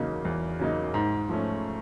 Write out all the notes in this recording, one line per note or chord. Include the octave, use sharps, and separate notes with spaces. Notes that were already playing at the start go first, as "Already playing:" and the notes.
Already playing: E2 C#3 F#3 A#3 D#4
E2
C#3 F#3 A#3 D#4
G#2
F3 A3 C#4